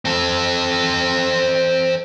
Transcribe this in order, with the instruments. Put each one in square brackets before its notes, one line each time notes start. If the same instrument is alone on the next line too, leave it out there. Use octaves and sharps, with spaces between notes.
[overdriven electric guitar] C4 A4